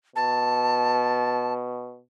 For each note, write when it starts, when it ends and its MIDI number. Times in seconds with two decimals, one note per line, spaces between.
0.16 2.00 47
0.16 1.53 81